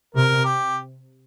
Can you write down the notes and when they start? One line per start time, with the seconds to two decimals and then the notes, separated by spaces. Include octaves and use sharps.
0.14 C3 A#4
0.44 G4